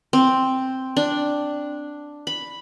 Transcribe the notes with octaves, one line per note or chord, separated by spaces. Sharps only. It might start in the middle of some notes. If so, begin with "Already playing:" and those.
C4
D4
B5